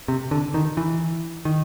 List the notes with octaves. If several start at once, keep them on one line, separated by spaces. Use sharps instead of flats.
C3
D3
D#3
E3
D#3